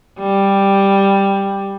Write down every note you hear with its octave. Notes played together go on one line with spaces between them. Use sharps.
G3